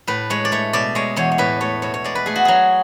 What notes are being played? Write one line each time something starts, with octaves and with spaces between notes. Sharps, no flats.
A2 B4
G#3 C#5
D5
A3 C#5
B2 D5
G#3 C#5
E2 C#5
C#5
A2 B4
A3 C#5
B2 C#5
C#5
G#3 D5
B4
A3 G#4
F#4
F#3 G#4